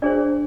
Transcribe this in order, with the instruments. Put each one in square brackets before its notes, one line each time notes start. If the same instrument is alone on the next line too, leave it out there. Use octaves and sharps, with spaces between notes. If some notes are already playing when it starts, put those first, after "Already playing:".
[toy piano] D4 G#4 C5 D5